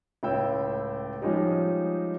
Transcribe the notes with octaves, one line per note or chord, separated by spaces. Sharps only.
C#2 A2 C#5 G5 E6
F3 G3 G#3 C#4 D#4 G4